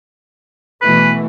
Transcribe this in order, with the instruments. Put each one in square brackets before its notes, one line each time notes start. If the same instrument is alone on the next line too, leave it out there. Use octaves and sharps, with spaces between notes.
[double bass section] B2 E3 A3 [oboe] B4